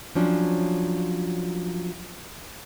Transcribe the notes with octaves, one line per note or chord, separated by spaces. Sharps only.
F3 F#3 C#4 D4